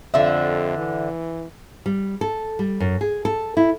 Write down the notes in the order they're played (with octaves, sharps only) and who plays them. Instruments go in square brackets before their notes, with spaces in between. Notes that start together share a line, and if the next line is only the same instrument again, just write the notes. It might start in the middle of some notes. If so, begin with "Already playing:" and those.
[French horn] F2 [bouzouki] D3 E5
[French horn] E3
[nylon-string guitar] G3
A4
G3
F#2
G#4
A4
E4